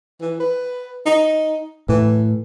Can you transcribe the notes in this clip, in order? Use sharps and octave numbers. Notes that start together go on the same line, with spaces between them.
E3
B4
D#4
A2 E3